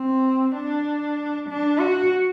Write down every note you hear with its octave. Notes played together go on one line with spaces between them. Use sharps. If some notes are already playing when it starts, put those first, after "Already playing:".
Already playing: C4
D4
D4
F#4